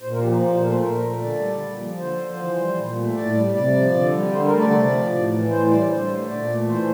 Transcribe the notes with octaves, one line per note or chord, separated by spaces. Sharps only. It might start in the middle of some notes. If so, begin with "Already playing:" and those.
A#2 C5
A#4
F3 G4
A#4
A#2 C5
C5
A3 A#4
C5
A#2 A#4
A3
D3 D5
G3
A#2
F3
D3 C5
F3
E3
G3
A#2
A3
A2 D5
G3
C3 D5
F3
D3
G3
D3 C5
A#4
A3
D5
C3
F3
A2
E3
A2 C5
G3 D5
D3 C5
A3
A#2 D5
A3
E3 C5